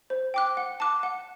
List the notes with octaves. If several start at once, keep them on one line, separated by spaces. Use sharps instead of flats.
C5
G5 D6 F#6
F#5
A5 D6 F#6
F#5